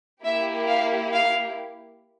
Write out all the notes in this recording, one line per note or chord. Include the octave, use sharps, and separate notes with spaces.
A#3 E4 G4 E5
F5
F5